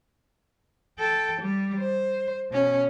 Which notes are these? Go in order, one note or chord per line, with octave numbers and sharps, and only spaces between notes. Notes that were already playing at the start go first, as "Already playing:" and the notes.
A4 G5
G3
C5
B2 C#4